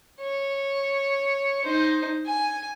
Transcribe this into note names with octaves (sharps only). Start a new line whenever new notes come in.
C#5
D#4 C5
G#5